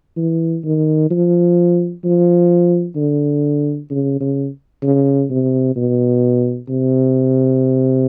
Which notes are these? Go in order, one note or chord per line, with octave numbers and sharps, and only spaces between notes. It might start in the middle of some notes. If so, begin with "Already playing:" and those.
E3
D#3
F3
F3
D3
C#3
C#3
C#3
C3
B2
C3